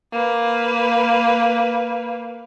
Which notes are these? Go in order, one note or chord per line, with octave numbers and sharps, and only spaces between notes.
A#3 B4